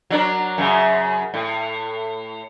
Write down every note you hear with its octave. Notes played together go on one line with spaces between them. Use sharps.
F#3 D4 A#4
F#2 C#3
A2